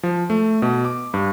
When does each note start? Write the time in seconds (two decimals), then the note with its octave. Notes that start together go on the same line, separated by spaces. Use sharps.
0.03 F3
0.30 A3
0.62 B2
0.85 D6
1.14 G2